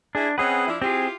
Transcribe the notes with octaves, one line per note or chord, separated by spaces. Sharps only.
D4 E4 G#4
C4 C#4 G#4 B4 D#5 F#5
F3 D4 E4
C4 E4 F4 G4 G#4